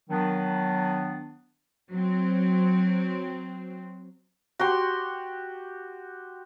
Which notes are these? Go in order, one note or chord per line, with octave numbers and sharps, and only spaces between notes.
D#3 F#3 B3 D4
F#3 C4
F#4 G4 C6